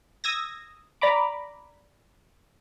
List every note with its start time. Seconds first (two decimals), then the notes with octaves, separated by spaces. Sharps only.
0.24 D#6 E6 G#6 A#6
1.01 D5 A#5 B5 D6